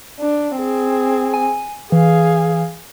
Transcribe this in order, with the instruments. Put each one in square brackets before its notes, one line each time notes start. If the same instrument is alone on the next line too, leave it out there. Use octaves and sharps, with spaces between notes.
[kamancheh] D4
C4 G#4
[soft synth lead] G#5
[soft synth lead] E3 [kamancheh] G#4 F5